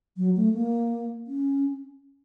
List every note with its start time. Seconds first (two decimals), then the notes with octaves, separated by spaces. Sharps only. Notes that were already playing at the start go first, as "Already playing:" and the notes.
0.17 F#3
0.36 A3
0.54 A#3
1.27 C#4